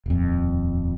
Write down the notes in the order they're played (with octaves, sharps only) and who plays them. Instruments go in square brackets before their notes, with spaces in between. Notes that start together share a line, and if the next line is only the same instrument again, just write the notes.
[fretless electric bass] D#1 F2